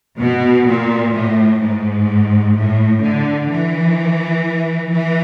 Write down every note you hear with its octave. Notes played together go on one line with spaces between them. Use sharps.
B2
A#2
A2
G#2
A2
D3
E3
E3